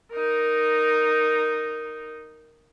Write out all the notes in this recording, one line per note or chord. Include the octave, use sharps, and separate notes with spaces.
D#4 A#4